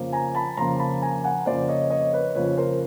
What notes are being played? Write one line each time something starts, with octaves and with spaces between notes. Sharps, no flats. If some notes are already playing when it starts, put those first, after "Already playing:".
Already playing: F2 C#3 F3 A#3
G#5 A#5
A5 B5
F2 C#3 F3 A#3 A#5 C6
A5 B5
G#5 A#5
F#5 G#5
F2 C#3 F3 A#3 C5 D5
C#5 D#5
C#5 D#5
B4 C#5
F2 C#3 F3 A#3 B4 C#5
A#4 C5